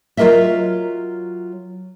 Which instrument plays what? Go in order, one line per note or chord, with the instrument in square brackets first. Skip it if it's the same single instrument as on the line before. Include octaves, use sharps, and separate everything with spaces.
[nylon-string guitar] F#3 F4 G#4 A#4 D#5 E5